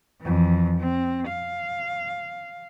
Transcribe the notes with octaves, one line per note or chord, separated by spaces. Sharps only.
F2 E3
C4
F5